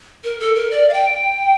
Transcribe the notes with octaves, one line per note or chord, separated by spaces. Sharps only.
A#4
A4
A#4
D5
F5
G5